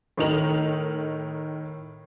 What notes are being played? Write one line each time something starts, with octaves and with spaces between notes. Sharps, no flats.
A2 D#3 D#4 A#4 F7 F#7